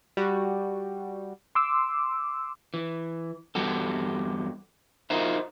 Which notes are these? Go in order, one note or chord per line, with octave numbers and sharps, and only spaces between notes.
G3 F#4
C6 D6 E6
E3
E2 G2 F#4 G4 A4
D#4 F4 F#4 A#4 C5 E5